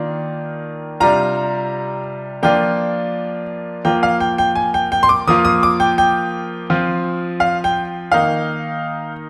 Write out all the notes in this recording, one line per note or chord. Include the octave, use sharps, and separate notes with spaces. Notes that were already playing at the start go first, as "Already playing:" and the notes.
Already playing: D#3 A#3 D4 F4
C3 G3 D4 F4 A#5
F3 A#3 D4 F4 G5
F3 A#3 F4 G5
F5
G5
G5
G#5
G5
G5
C6
D6
F3 A#3 F4 D#6
D#6
D6
G5
G5
F3 C4 F4
F5
G5
D#3 A#3 D#4 F5